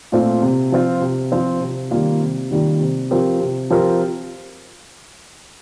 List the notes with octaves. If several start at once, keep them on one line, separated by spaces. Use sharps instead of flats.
A#2 A3 C4 F4
C3
F3 C4 F4
C3
F3 C4 F4
C3
D#3 G3 A#3 F4
C3
D#3 G3 A#3 F4
C3
F3 C4 G4 A#4
C3
F3 C4 G4 A#4